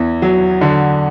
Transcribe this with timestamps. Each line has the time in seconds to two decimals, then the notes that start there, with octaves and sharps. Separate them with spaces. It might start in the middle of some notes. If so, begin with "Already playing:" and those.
Already playing: E2 E4
0.22 F#3
0.61 D3